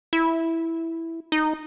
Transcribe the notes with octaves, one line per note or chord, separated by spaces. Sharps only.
E4
D#4